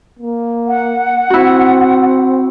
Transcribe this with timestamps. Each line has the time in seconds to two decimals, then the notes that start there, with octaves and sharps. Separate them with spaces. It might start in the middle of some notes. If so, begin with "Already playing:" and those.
0.19 A#3
0.67 F#5
1.30 C4 E4 F#4